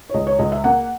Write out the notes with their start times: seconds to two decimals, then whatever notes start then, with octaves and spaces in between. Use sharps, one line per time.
0.10 C#5
0.14 C#2 D#5
0.27 C#5
0.39 C#2 D#5
0.52 E5
0.64 A#3 F#5